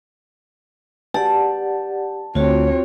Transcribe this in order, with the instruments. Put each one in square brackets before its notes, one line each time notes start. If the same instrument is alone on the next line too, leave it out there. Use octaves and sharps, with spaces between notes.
[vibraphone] G4 D5 F#5 [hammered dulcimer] A5
[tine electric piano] D2 [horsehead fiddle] C4 C#5 [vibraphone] F4 F#4